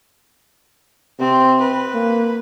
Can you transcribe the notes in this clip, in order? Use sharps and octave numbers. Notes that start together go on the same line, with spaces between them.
C3 C4
B4
A#3